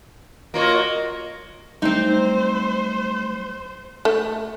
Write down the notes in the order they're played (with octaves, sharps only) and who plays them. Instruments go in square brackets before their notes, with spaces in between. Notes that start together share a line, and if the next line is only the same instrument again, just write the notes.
[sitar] A#3 F4 C#5 [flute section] F#4 A#4 D#5
[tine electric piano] F#3 G3 A3 [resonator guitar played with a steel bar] C4 D#4 [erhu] C5
[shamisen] A3